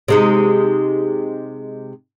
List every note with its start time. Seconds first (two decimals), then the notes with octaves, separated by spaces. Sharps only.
0.08 C3 G#3 D#4